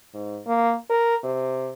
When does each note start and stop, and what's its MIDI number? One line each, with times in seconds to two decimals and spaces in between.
0.14 0.39 44
0.46 0.75 58
0.90 1.15 70
1.23 1.72 48